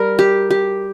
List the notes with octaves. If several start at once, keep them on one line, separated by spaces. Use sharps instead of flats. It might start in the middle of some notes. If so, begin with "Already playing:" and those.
Already playing: G3 A#4
G4
G4